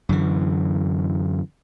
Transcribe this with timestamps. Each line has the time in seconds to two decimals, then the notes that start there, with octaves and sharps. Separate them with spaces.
0.09 F#2 D3 E3